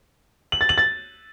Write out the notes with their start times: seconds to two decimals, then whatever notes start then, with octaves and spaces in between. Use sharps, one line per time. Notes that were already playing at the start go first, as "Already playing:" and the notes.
0.52 F#7
0.61 A6
0.69 F#7
0.78 A6